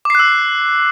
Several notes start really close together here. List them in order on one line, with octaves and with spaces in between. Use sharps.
D6 C7 F#6 E6